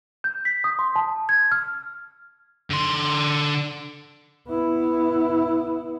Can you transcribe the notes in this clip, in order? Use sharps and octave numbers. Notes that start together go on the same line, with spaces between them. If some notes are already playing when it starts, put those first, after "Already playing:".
G6
B6
D#6
C6
A5
G#6
F6
D3 C6
B3 E4